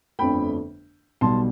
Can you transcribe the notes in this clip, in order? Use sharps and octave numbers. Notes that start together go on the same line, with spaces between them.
G1 F2 D3 A3 G5 B5
B1 B2 G3 A5 C6